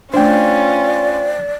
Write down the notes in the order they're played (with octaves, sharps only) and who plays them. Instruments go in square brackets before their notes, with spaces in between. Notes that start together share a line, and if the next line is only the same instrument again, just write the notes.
[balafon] A3 D4 [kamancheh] C#4 F4 [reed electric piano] C5 G5 [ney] D5